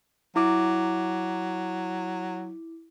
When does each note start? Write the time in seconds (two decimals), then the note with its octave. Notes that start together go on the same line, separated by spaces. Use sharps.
0.36 F#3 E4 D6